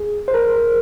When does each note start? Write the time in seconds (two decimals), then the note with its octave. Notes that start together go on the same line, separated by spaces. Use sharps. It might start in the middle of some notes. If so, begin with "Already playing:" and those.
Already playing: G#4
0.28 C5
0.34 A#4